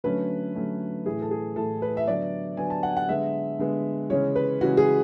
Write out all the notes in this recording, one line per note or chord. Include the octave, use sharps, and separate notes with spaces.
D3 F#3 A3 C#4 B4
D3 F#3 A3 C#4
A2 E3 A3 G#4
A4
G#4
A2 E3 A3 A4
B4
E5
D3 F#3 B3 D5
D3 F#3 B3 G#5
A5
F#5
F#5
D3 G#3 B3 E5
D3 G#3 B3
C#3 E3 G#3 C#4 C#5
B4
C#3 E3 G#3 C#4 F#4
G#4